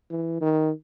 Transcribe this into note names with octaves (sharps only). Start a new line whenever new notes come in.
E3
D#3